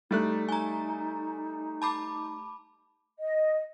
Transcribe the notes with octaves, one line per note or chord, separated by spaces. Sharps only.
G3 A3 D#4 F#6
D#4 G#5 A#5
A5 B5 D6
D#5